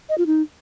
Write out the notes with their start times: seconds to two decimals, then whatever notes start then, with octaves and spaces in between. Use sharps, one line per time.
0.09 D#5
0.18 F4
0.27 D#4